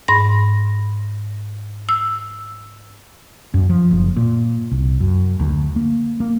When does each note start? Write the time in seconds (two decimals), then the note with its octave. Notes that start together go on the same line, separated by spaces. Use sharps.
0.08 G#2 B5 A#6
1.89 E6
3.54 F#2
3.69 F3
3.91 F#1
4.17 A#2
4.71 C2
5.00 F#2
5.40 D2
5.76 A#3
6.20 A#3